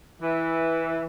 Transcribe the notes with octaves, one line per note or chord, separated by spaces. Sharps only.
E3